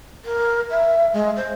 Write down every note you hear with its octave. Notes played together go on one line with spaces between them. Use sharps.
A#4
E5
G#3
C5